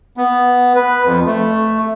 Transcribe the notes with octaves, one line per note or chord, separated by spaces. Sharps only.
B3
B4
F2
A3